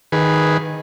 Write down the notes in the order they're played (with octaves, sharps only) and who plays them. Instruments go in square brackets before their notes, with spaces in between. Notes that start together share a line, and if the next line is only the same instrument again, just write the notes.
[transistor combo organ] D#3 G#4 B4